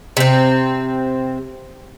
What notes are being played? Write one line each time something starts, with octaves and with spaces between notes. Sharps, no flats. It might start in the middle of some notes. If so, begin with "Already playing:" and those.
C3 C4